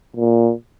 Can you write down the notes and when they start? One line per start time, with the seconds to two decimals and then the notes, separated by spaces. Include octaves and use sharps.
0.16 A#2